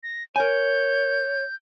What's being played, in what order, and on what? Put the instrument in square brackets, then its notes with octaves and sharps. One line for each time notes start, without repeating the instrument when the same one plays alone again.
[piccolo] A#6
[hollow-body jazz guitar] A#4 G#5 [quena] C#5 [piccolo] G6